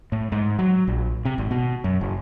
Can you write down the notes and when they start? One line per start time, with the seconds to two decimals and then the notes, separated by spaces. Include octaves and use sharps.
0.12 A2
0.32 G#2
0.59 F#3
0.88 A#1
1.25 C3
1.38 G#1
1.51 B2
1.84 F#2
2.01 F#1